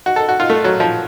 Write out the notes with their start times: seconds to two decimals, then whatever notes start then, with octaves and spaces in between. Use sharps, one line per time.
0.06 F#4
0.16 A4
0.29 F#4
0.40 F4
0.50 A3
0.64 F#3
0.80 F3